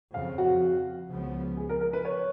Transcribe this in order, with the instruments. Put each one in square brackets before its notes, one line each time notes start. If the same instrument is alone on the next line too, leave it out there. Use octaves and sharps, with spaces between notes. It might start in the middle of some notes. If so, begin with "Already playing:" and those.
[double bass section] F2 C#3 F3 [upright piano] F5
[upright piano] F#4
[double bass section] C#2 C#3 F3 B3
[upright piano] G#4
A#4
A#4
B4
C#5